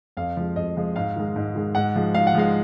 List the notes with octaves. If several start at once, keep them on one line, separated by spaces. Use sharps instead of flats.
F2 F5
F3 G#3
F2 D#5
F3 G#3
G#2 F5
D#3 G#3
G#2
D#3 G#3
G#2 F#5
F3 G#3
G#2 F5
F#5
F3 G#3 F5